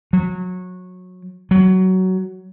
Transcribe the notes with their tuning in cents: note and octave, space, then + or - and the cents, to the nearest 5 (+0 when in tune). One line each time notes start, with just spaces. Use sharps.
F#3 -20
F#3 +15